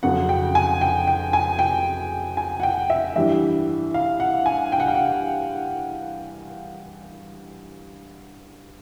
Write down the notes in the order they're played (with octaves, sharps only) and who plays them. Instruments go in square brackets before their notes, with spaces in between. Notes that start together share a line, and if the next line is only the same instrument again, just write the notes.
[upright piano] F2 C#3 F#3 F#5
G5
G#5
G5
G5
G#5
G5
G#5
F#5
G5
E5
G2 E3 G3 E5
F5
F#5
G#5
G5
F#5
F5
F#5